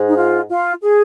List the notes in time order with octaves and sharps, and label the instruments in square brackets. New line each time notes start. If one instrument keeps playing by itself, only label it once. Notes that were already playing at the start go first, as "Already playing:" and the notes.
Already playing: [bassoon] G#2
[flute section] D#4
F4
F4
G#4